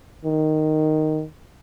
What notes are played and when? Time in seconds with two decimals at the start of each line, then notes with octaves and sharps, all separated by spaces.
0.25 D#3